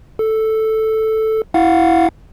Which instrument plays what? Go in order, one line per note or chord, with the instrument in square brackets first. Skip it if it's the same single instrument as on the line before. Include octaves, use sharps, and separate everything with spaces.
[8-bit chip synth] A4
E4 F5 F#5